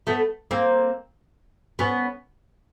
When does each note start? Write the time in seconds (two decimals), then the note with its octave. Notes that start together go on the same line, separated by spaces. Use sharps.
0.07 A3 B3
0.51 A#3 C4
1.79 B3 C#4